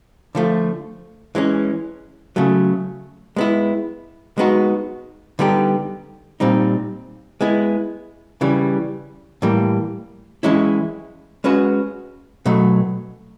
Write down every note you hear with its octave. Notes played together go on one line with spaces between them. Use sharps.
D3 F3 A3
E3 G#3 C#4
C#3 F#3 A3
G#3 B3 E4
G#3 B3 D#4 F#4
D3 G3 B3 D#4 G4
A#2 G3 C4 D#4
G#3 B3 E4
C#3 E3 G3
A2 E3 G3 A#3
E3 G#3 C#4 E4
G#3 C#4 F#4 B4
B2 F#3 A3